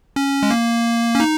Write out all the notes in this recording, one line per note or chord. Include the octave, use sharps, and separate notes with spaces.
C#4
G#3
A#3
C#4
D#4